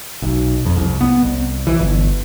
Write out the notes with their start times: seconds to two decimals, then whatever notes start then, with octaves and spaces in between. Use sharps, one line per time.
0.22 B1
0.66 F2
0.77 C2
1.01 B3
1.22 C2
1.67 E3
1.79 G1